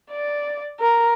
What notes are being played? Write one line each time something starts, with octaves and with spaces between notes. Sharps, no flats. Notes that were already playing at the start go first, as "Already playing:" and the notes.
D5
A#4